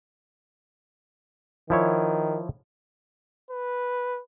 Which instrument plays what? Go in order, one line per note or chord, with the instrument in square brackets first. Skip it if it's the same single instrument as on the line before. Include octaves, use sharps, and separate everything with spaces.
[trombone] D#3 [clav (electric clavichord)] F3 E4 C#5
[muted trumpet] B4